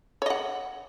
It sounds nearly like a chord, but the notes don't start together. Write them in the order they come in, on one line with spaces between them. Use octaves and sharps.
C#5 D#5 F#5